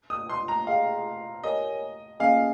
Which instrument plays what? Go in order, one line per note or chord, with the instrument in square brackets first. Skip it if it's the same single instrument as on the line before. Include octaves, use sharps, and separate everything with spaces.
[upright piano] D#6
C6
A#5
[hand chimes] G#4 D#5 G5 [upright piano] F5
[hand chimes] G4 A#4 C#5 G#5 [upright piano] D#5
[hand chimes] A#3 C#4 G#4 D#5 G#5 [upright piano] F5